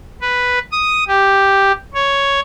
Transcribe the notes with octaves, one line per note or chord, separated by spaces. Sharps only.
B4
D#6
G4
C#5